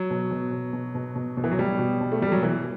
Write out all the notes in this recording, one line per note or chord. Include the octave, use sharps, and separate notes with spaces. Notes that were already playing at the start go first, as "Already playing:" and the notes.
Already playing: F#3
B2
B2
B2
B2
B2
B2
B2
E3
F#3
B2 G3
B2
B2
A3
B2 G3
F#3
B2 E3